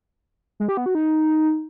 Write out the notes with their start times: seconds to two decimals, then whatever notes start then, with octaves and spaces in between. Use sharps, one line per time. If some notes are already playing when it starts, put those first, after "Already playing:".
0.60 G#3
0.69 G4
0.77 B3
0.86 F#4
0.95 D#4